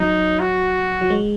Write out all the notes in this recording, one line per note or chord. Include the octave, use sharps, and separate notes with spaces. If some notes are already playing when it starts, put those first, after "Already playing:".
Already playing: F#3 D#4
F#4
F#3
G#3